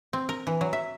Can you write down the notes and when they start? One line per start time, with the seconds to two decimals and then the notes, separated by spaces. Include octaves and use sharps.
0.13 C4
0.29 A#4
0.47 E3
0.61 F#3
0.73 E5